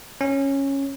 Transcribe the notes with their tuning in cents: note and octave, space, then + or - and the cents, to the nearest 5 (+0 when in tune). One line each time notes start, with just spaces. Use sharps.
C#4 -10